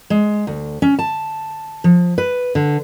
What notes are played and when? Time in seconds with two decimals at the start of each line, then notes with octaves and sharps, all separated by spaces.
0.10 G#3
0.47 D2
0.82 C#4
0.99 A5
1.84 F3
2.18 B4
2.55 D3